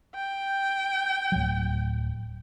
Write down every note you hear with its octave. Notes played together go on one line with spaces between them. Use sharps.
G5
D1 F#3